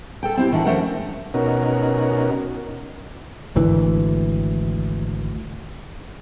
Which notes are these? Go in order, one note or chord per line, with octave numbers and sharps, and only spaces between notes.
A4 G5
C4 E4 G4
D#3 E3 D4 F#4
F2 C#3 A3 C#4 A#4 F#5
B2 C#4 D#4 F#4 A#4
G#1 D2 E3